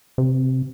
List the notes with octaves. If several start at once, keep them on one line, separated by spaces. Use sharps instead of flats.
C3